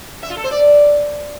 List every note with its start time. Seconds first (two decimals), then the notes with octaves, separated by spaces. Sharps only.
0.23 E5
0.30 F4
0.37 A4
0.44 C5
0.51 D5